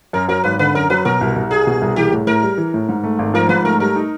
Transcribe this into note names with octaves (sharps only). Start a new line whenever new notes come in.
F#2 A#4
F#3 A#4
G#1 B4
D3 B4
F#2 A#4
F#3 B4
B2 A#4
C2
C2
G3 G#4
B2
C2
E3 G4
A2
A2 A#4
G3
E3
A2
G#2
A3
G#1
F3 A#4
G#2 B4
A3 A#4
G3 A#4
D#4